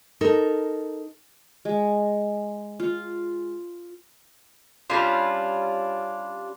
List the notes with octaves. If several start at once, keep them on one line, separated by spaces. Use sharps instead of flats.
D#4 A4 A#4
G#3
F4
G3 C#4 D4 F4